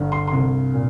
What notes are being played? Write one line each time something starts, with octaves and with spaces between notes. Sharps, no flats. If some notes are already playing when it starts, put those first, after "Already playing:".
Already playing: G1 G2
C6
C2 C6
A#2